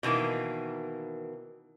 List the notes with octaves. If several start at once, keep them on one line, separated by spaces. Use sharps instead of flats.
B2 D#3 E3 A#3